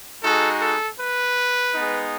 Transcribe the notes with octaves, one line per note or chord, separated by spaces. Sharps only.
G#3 D#4 F#4 A4
A4
B4
G#3 B3 D#4